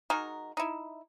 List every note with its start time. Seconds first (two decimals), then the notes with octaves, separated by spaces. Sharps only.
0.10 G#3 D#4 F#4 A#4
0.57 D#4 E4